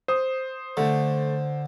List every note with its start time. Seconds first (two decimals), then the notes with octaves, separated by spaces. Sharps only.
0.08 C5 D#6
0.77 D3 A3